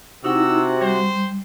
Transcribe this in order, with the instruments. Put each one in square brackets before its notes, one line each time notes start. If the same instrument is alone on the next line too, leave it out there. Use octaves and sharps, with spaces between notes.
[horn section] C3 F#4 [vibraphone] D#4 E4 [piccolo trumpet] E6
[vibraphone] G3 [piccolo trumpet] C5